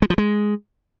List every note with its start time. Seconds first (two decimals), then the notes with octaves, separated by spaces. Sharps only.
0.02 G#3
0.10 F3
0.18 G#3